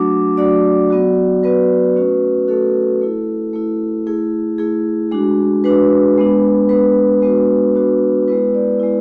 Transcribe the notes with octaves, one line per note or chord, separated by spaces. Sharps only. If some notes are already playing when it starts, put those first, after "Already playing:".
Already playing: F#3 A3 D4 F#4 D6
F#3 A3 D4 F#4 D5
F#3 B3 F#4
F#3 B3 F#4 B4
A3 C#4 F#4
A3 C#4 F#4 A4
A3 E4
A3 E4
A3 E4 G#4
A3 E4 G#4
G#3 D4 F#4
G#3 D4 F#4 B4
G#3 B3 D4
G#3 B3 D4 B4
G#3 B3 D4 F#4
G#3 B3 D4 F#4
G#3 B3 E4 B4
D5
G#3 B3 E4